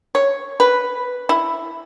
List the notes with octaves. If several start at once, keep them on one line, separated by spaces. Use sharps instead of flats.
C#5
B4
E4